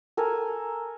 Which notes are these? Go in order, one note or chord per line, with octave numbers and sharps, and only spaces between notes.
A4 A#4 G#5